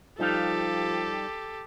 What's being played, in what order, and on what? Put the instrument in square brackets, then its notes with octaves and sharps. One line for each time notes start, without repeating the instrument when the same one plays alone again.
[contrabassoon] F3 [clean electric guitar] G3 D#4 F5 [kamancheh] G4 A4